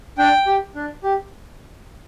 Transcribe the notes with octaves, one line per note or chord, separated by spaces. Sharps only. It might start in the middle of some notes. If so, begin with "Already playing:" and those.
D4 G5
G4
D4
G4